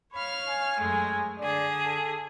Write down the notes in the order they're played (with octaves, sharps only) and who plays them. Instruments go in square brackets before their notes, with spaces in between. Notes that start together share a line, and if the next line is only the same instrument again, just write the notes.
[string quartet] C#5 F5 F6 [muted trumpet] B5
[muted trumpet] G#5
[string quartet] F#2 G#3 A3
[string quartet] D3 G#4 [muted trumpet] D5
[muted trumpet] A4